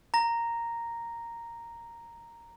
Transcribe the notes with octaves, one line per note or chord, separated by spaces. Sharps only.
A#5 A#6